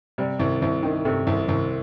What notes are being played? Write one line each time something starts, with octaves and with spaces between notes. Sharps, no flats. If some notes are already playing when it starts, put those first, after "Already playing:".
C3 G3
C2
C2
D#3
C3 A3
C2
C2